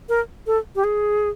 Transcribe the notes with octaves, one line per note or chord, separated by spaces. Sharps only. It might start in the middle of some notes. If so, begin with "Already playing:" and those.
A#4
A4
G4
G#4